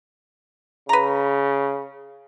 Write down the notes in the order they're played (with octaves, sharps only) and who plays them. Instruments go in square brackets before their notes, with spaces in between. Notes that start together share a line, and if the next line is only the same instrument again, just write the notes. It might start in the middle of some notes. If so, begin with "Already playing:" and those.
[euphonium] C#3 [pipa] B4 A#5